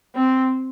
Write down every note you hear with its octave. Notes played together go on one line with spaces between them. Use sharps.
C4